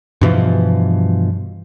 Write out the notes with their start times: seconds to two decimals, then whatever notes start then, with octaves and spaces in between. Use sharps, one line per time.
0.21 G2 B2 E3 F3